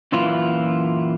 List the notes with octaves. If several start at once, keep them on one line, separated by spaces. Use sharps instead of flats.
F#2 A#2 E3 E4 F4